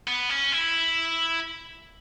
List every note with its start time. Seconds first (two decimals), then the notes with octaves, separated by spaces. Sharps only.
0.07 B3
0.30 C#4
0.52 E4